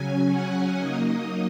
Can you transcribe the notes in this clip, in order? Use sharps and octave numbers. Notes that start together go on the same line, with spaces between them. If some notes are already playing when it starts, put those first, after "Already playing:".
Already playing: C#3 F#3 C#4 G#5
F#5
F#3 A#3 D#4 D#5
D#5